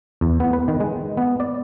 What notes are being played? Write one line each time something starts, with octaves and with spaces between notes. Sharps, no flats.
E2
B3
B4
D#3
G#3
B3
D5